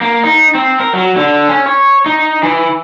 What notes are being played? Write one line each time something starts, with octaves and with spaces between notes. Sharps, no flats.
A#3
D#4
C4
A#4
F#3
D3
C#4
C#5
D#4
E3